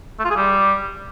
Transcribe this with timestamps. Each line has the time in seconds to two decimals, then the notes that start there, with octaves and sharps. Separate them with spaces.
0.19 A3
0.25 F4
0.30 G#4
0.36 G3